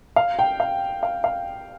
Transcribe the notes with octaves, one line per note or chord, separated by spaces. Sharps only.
F5
G5
F5
F5
F5